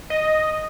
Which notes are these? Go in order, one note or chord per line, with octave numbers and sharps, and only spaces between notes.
D#5